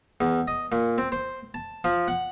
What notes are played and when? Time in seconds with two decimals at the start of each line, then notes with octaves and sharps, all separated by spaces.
0.21 E2
0.48 D#5
0.72 A#2
0.98 C4
1.12 C5
1.54 A5
1.84 F3
2.08 F#5